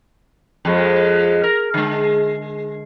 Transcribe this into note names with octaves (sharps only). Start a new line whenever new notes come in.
F2 G#3
A#4
D3 G#3